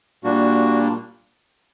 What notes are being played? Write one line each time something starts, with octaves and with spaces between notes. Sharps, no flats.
A#2 G3 A#3 D4 F#4